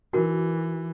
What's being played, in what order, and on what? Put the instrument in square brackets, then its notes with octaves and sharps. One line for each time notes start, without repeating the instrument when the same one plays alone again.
[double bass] E3 [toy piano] D#4 F#4 A#4